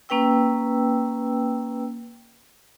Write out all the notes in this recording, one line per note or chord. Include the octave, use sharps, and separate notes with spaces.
A#3 C#4 B4 G5 E6